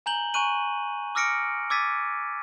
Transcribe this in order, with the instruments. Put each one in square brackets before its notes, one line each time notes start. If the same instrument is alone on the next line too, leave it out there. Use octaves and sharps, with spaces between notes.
[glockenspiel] G#5 A#5 G6 F#7 G7
G#5 A#5 C#6 F#6 D#7 F#7
D6 E6 F6 A#6 C#7 D7
D6 E6 G#6 A6 B6 D#7